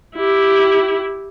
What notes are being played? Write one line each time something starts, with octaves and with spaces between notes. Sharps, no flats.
E4 G4